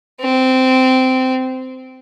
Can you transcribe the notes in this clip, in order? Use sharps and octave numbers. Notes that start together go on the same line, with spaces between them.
C4